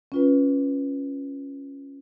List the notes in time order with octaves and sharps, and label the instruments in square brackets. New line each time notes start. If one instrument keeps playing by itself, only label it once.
[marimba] C#4 F4 B4